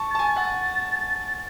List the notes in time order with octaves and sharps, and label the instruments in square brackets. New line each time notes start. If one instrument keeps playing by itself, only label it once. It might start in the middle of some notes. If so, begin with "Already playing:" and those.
Already playing: [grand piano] A5 C#6
[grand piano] A5 [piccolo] A6
[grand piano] G#5
[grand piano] F#5 [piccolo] A6